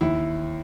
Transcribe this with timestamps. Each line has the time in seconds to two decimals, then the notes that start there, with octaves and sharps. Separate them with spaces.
0.01 D#2 E4